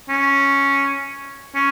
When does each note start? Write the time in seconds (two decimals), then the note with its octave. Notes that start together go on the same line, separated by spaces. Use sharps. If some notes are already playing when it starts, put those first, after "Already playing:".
0.09 C#4
1.55 C#4